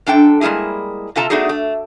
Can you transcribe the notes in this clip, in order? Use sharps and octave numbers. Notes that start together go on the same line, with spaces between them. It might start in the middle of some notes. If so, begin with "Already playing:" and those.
F#2 D4 A4 G5
G3 G#3 A#3 E4 G#4
C3 F4 A4 A5 A#5
A3 B3 D4 D#4 F#4 G#4
A3